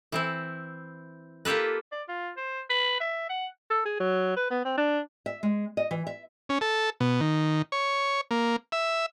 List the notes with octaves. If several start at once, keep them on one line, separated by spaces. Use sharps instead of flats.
E3 C4 E4
A#3 F4 G4 A4 B4
D5
F4
C5
B4
E5
F#5
A4
G#4
F#3
B4
B3
C4
D4
E5
G#3
D#5
E3
E5
C#4
A4
B2
D#3
C#5
A#3
E5